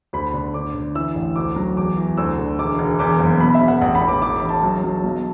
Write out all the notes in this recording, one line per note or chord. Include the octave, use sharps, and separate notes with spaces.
D2 B5
D3
D3 D6
D3
E3 E6
A1
D2 D6
F#3
E2 D6
E3
D2 E6
D3
E1 D6
E1
E2 D6
F#1
B2 B5
E5
E1
F#5
A1 F#5
B5
A1
D6
E1 D6
B5
E1
A5
F#3
F#3
B1